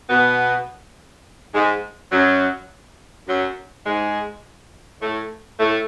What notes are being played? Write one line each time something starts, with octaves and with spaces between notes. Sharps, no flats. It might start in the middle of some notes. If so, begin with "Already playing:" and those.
B2 B3
G#2 G#3
F#2 F#3
F#2 F#3
G#2 G#3
A2 A3
A2 A3